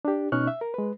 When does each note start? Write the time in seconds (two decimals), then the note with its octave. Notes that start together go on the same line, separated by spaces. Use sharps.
0.05 D4 G4
0.32 B2 C#4 D#4 C#6 F6 F#6
0.47 E5
0.61 A#4
0.74 G#3 B4